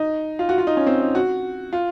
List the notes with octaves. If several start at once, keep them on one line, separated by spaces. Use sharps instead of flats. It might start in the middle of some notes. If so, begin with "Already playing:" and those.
Already playing: D#4
F4
F#4
F4
D#4
C#4
C4
D#4
F#4
F4